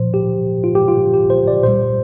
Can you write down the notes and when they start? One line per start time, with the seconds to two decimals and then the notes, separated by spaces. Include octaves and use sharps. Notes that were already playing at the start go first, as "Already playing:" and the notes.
Already playing: A#2 F3 C5
0.14 G4
0.64 F4
0.75 G4
0.88 F4
1.13 G4
1.30 C5
1.48 D5
1.63 A#2 G3 C5